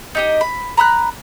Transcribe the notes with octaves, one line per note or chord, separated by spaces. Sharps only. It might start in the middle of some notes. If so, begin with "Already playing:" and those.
D#4 G4 D#5
B5
A#5 B5 E6 F#6